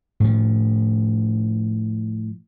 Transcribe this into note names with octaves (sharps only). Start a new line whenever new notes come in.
A2 F3